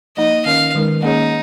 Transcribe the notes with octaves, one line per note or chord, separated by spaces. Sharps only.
F3 A#3 D#4 D#5
D#3 C#4 A#4 C#5 F5
D#3 G#3 D#4 A#4
A#3 C#4 D#4 G#4 C#5